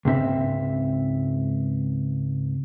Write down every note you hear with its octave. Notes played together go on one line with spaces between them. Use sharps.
C#2 G#2 C4 E5